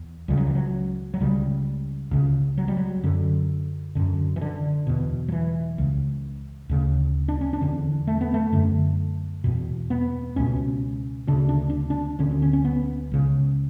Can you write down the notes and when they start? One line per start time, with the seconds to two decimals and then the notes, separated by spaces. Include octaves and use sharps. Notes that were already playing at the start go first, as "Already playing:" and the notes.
Already playing: E2
0.28 C#2 C#3 G3
0.37 F#3
0.47 E3
0.55 F#3
1.14 F#3
1.20 C#2 C#3 G3
2.11 C#2 C#3
2.58 F#3
2.68 G3
2.77 F#3
3.04 F#2 D3
3.95 F#2 D3
4.36 E3
4.42 D3
4.87 E2 B2
5.28 F#3
5.32 E3
5.78 C#2 C#3
6.69 D2 C#3
7.28 D4
7.41 C#4
7.53 D4
7.61 E2 D3
8.07 A3
8.21 B3
8.34 A3
8.53 F#2 D3
9.44 E2 B2
9.90 B3
10.36 C#2 B2 C#4
11.27 D2 C#3 D4
11.49 D4
11.70 D4
11.90 D4
12.19 D2 D3 C#4
12.31 C#4
12.42 C#4
12.53 C#4
12.65 B3
13.12 C#2 C#3